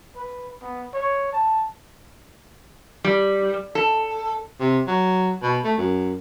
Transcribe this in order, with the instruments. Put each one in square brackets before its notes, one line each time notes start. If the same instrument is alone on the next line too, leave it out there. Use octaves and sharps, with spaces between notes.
[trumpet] B4
B3
C#5
A5
[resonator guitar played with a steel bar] G3
A4
[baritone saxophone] C3
F#3
B2
A3
F#2